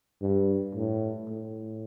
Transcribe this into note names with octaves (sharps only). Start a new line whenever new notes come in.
G2
A2
A2